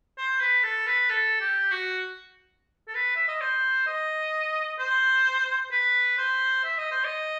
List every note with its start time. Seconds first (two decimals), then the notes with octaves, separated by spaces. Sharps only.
0.18 C5
0.41 B4
0.63 A4
0.87 B4
1.09 A4
1.41 G4
1.71 F#4
2.88 A4
2.95 B4
3.16 E5
3.28 D#5
3.41 C5
3.87 D#5
4.79 C5
5.71 B4
6.18 C5
6.64 E5
6.78 D#5
6.91 C5
7.05 D#5